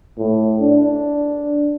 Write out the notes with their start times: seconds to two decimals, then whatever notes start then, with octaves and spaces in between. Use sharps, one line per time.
0.17 A2
0.61 D4